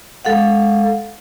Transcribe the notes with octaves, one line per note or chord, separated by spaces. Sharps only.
G#3 A4 F5 F#5